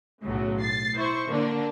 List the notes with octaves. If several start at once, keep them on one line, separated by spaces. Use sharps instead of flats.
B1 A2 C#3 F#3
A6 C7
E4 C5 C#6
D3 A#3 D4